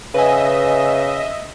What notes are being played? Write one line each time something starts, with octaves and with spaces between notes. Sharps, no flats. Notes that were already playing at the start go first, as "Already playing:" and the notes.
C#3 B4 D#5 E5 G#5